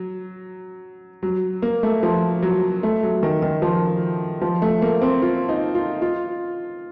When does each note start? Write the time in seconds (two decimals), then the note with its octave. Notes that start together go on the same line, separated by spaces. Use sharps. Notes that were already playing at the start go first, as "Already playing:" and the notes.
Already playing: F#3
1.23 F#3
1.62 A#3
1.83 A3
2.03 F3
2.43 F#3
2.83 A3
3.03 F#3
3.23 D#3
3.42 D#3
3.62 F3
4.41 F3
4.62 A3
4.82 A#3
5.02 C4
5.22 F4
5.49 D#4
5.75 F4
6.02 F4